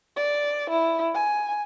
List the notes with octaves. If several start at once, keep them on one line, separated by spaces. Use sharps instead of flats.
D5
E4
G#5